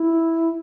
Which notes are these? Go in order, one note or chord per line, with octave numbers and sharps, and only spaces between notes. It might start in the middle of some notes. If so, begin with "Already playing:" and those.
Already playing: E4